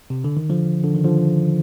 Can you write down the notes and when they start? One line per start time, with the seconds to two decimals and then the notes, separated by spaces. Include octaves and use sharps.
0.10 C3
0.24 D3
0.37 D#3
0.50 D3 F3
0.84 D3
0.94 D#3
1.04 D3 F3